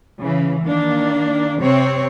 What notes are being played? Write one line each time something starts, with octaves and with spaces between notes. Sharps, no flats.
C#3 E3
D#3 A#3 D4
C3 C4 C#5